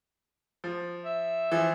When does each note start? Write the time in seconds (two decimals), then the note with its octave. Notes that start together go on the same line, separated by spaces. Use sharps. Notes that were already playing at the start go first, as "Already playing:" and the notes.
0.64 F3
1.05 E5
1.52 E3 F3